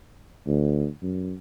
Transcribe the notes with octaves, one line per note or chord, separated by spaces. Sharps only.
D2
F#2